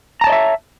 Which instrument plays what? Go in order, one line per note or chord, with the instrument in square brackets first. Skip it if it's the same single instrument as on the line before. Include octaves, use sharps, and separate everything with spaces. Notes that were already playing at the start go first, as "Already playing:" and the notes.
[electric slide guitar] A#5
A5
C#5
D#5
E5